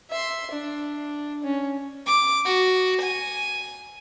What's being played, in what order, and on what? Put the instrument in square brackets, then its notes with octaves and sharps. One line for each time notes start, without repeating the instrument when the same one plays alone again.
[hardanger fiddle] E5 C6
D4
C#4
[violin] D6
F#4
G#5